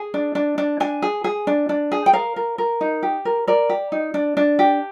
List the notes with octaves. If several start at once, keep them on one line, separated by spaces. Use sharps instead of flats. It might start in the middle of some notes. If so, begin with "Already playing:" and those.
Already playing: G#4
D4
D4
D4
D4 G#5
G#4
G#4
D4
D4
G#4
G5
A#4 F5
A#4
A#4
D#4
G4
A#4
A#4 D5
G4
D#4
D4
D4
G4